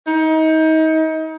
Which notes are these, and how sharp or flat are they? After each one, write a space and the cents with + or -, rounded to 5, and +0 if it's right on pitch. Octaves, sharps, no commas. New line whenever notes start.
D#4 +30